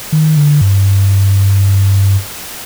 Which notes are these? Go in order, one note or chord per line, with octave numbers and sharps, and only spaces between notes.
D#3
D3
G2